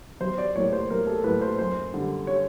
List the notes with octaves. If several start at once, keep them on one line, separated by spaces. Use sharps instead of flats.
B1 C5
D5
A2 F#3 A#3 C#5
C5
B1 A#4
A4
A2 F#3 A#3 B4
C5
F#2 C5
D3 G3
C#5